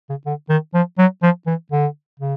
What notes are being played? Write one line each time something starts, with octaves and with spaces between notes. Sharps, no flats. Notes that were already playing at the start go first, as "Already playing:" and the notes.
C#3
D3
D#3
F3
F#3
F3
E3
D3
C#3